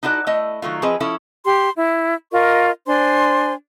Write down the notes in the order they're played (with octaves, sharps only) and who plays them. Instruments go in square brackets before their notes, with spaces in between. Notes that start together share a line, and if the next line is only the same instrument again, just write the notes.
[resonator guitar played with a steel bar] D#4 E4 F#4 A4 D5
A3 E4 D#5
D#3 F#3 A3 F4
F3 C4 G#4 B4 D#5
F3 C#4 E4 A4
[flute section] G4 C6
E4
F4 A#4 D#5 C#6
D4 C5 G#5 C6